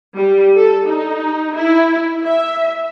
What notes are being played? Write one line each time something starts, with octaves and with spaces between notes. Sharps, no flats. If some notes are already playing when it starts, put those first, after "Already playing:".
G3
A4
D#4
E4
E5